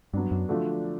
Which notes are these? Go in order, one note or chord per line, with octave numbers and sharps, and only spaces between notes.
G2 F#3 B3 D4
F#2
D3 F3 A3 D4 F#4